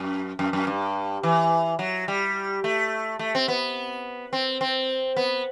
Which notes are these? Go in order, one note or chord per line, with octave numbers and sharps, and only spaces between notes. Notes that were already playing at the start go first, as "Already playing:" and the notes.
Already playing: F#2
F#2
F#2
G2
E3
F#3
G3
A3
A3
C4
B3
C4
C4
B3